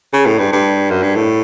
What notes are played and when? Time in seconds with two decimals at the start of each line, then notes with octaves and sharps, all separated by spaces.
0.13 C#3
0.27 A2
0.39 G2
0.52 G2
0.90 F#2
1.03 G2
1.16 A2